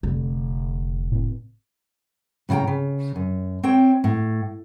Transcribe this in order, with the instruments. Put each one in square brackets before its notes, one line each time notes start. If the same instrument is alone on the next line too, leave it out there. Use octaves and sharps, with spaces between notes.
[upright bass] F1 D3
[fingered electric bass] A2 C4
[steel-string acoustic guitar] A2 C#3 F#5 G5 A#5
C#3
F#2
C4 C#5 G5
A2